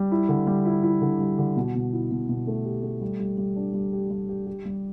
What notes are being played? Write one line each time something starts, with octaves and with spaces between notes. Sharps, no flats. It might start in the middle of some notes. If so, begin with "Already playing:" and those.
Already playing: G3
E4
D3
G3
E4
E4
D3
G3
D3
B2
B2
E4
B2
B2
A3
G4
A3
G3
G3
G3
D4
G3
G4
G3
G4
G4
G3